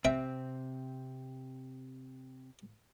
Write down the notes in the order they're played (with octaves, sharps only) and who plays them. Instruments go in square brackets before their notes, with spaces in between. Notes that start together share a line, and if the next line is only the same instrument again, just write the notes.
[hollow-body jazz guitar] C3 C4 [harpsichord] E5 G5